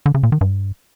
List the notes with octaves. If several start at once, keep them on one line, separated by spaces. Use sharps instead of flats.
D3
C#3
A#2
D#3
G2